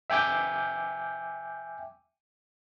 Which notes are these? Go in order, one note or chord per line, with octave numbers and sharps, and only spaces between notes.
E5 G5 G#5 D6 G6